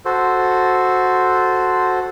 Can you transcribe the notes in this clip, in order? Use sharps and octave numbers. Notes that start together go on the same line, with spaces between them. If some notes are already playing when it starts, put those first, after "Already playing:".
F#4 A4 C5